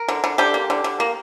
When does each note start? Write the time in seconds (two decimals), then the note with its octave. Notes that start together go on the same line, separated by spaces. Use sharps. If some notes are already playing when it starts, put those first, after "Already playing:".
Already playing: A#4
0.08 D3
0.24 D3
0.38 D3 G4
0.54 A#3
0.70 D3
0.84 D3
1.00 A#3